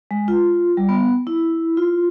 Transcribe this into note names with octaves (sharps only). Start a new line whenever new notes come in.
G#3
F4
G3
B3
E4
F4